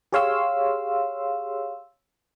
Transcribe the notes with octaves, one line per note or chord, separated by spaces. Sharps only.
G4 G#4 C#5 F5 C6 E6